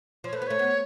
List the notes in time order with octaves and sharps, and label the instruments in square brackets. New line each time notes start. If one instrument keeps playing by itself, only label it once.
[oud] F3 [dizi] C#5
[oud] A3 [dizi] B4
[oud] B3
[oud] A3 [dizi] C#5
[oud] B3